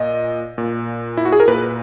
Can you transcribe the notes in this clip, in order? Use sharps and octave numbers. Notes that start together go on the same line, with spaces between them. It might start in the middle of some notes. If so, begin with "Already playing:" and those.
Already playing: A#2 D#5
A#2
E4
F#4
G#4
A#4
A#2 B4